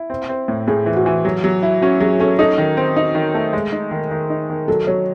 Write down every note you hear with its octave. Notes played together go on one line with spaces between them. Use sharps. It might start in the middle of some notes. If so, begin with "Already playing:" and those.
Already playing: E4
C4
C4
A2
A2 G#4
E3
F#4
E3
F#3
F#3
E4
C#4 F#4
F#3 G#4
C#4 A4
D#4 A4
D#3
C4
D#4
D#3
A3
G#3
D#4
D#3
D#3
D#4
D#3
F#3 A4
F#3 C#5